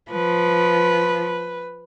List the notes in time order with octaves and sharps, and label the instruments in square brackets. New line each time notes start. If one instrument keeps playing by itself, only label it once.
[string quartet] F3 [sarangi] B4